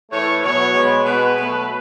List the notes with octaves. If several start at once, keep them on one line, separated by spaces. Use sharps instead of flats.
A2 E3 A3 C#5
B2 F#3 B3 C#5
B2 G#3 B3
B2 G#3 B3 B4
B2 F#3 A3